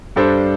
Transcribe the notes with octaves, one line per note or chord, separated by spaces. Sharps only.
G2 G3 D4 A4 C5